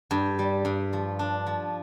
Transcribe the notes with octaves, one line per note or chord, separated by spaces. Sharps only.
G2
G3
G2
F3
D4
F3